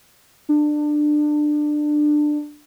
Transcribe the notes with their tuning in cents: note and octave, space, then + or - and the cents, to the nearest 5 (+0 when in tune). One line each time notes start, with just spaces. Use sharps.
D4 +20